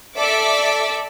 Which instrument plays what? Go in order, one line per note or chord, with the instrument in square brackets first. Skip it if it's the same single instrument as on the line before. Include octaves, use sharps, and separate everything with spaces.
[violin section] A4 D5 E5 D6 E6